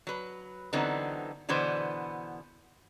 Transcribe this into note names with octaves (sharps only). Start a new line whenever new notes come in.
F#3 B4
D3 E3 F#3 B3 C4 D#4
B2 D3 E3 B3 C5